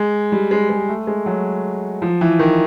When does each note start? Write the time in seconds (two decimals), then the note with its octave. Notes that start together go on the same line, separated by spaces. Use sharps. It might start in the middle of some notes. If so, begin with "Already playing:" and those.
Already playing: G#3
0.32 G3
0.51 G#3
0.70 G#3
0.89 A3
1.07 G#3
1.26 F#3
2.02 F3
2.21 E3
2.39 D#3